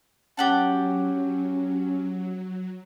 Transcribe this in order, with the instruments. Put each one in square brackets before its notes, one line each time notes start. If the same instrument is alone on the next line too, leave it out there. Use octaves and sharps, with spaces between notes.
[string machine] F#3 [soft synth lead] C#4 [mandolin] G4 F#5 A5